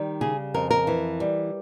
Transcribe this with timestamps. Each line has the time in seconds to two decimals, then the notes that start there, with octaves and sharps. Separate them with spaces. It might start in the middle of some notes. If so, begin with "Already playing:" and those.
Already playing: D#3 G3
0.21 C#3 G#4
0.54 F2 A#4
0.71 A#4
0.87 E3
1.20 G3